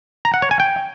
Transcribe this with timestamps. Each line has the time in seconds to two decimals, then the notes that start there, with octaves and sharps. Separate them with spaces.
0.25 A#5
0.34 F#5
0.42 C#5
0.51 G#5
0.60 G5